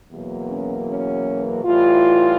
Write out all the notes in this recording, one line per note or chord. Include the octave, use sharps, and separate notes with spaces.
E2 B2 F#3 A#3
C#4
C#4
A2 E3 G3 F4